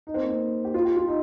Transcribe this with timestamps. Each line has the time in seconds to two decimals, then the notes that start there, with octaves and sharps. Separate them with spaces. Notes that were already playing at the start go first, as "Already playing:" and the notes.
0.07 D#4
0.14 C4
0.23 A#3
0.29 C4
0.65 G4
0.74 F4
0.85 G4
0.97 F4
1.08 D#4